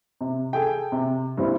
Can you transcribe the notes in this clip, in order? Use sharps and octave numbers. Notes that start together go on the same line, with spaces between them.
C3
G#4 A4 G5
C3
G2 G3 C4 E4